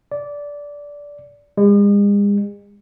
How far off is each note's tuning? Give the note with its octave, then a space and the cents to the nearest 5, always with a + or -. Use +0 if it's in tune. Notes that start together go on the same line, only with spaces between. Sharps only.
D5 -15
G#3 -45